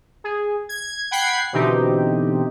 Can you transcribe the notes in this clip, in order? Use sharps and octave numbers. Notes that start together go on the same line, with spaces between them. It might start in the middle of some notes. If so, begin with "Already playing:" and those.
G#4
G#6
F#5 G5 B5 G#6 C7
B2 D3 E3 C4 D#4 G4